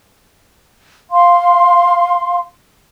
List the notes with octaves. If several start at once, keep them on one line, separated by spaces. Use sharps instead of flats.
F5 C6